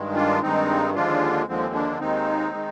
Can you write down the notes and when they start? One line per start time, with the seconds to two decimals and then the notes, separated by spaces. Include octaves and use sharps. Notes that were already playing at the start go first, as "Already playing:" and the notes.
Already playing: G2 D#3 G#3
0.16 D4 F4
0.43 G2 D#3 G#3 C4 D#4
0.95 D#2 D3 F3 G#3 D4 F4
1.48 D#2 D3 F3 G#3 C4
1.74 A#3 D4
2.00 D#2 D#3 G#3 C4 D#4
2.53 D#3 G#3